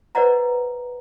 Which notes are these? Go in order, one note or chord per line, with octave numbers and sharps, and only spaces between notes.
B4 C5 D5 D#5 F#5 A#5